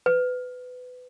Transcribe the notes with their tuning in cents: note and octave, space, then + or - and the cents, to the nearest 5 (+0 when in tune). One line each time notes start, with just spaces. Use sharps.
B4 +20